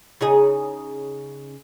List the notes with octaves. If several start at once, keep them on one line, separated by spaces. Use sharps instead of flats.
C#3 D#4 G#4